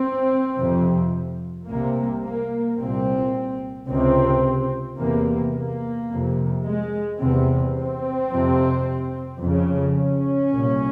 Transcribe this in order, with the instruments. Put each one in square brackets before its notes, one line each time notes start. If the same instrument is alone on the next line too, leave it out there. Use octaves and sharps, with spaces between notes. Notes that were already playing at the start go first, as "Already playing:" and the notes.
Already playing: [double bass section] C4
F2 C3
C2 C3 A#3
A#3
C2 A#2 C4
C#2 C3 C4
E2 C3 A#3
A#3
F2 C3
G#3
E2 C3 C4
C4
F2 C3
F2 C#3
C#4
C2 A#2